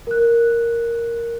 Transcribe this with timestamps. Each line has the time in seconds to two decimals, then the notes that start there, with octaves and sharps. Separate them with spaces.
0.07 A#4 F#6